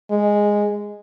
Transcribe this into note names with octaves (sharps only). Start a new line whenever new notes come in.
G#3